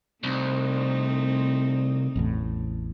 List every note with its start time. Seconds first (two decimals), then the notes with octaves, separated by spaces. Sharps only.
0.24 C2 A3 C4 D#4
2.16 A1 E2 A2